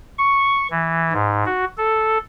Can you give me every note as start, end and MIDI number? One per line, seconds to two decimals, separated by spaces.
0.19 0.68 85
0.70 1.13 52
1.13 1.44 44
1.46 1.65 66
1.78 2.18 69